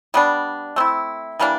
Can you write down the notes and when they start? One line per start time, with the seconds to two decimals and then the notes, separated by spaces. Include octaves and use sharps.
0.14 G3 B3 D4
0.76 A3 C4 E4
1.40 E3 G3 A#3 D4